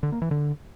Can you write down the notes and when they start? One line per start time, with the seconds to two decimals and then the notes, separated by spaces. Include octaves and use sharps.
0.03 D3
0.12 A#3
0.22 E3
0.31 D3